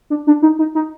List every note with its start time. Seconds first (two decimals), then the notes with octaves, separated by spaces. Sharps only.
0.10 D4
0.27 D4
0.42 D#4
0.59 D#4
0.75 D#4